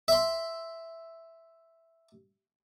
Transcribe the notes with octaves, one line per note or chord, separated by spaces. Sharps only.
E5 C6